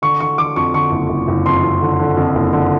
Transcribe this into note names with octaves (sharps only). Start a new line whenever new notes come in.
D3 C#6
D3 C#6
D3 D6
F2 C#6
D3 C#6
F#1
F#1
F#1
F2 C6
F2
D3
D3
F2
F#1
D3